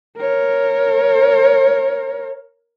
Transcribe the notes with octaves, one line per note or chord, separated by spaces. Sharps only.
A#4 C#5